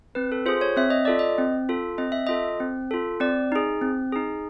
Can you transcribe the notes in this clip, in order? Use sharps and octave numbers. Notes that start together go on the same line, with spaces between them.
C4 B4
A4
F4 G#4 C5
C#5
C4 E5
D#5
F4 A4 D5
D#5
C4
F4 A4
C4 D#5
E5
F4 A4 D#5
C4
F4 A4
C4 D5
D#4 G#4
C4
D#4 G#4